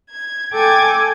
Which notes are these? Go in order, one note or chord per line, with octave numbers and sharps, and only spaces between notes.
G#6
A4 G5 G#5 D6 G#6